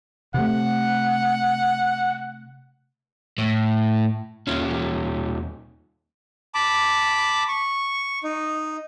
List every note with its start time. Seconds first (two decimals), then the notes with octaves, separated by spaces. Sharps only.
0.34 C3 A3 F#5
3.38 A2
4.47 D#2 C#4
6.54 A5 B5 D6
7.48 C#6
8.23 D#4